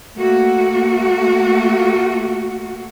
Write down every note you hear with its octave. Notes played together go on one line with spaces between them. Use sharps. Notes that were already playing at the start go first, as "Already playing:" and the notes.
A3 A#3 F#4